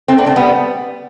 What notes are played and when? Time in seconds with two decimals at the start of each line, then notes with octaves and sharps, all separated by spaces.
0.08 A3 C4
0.18 B3 D4
0.26 A3 C4
0.36 G3 B3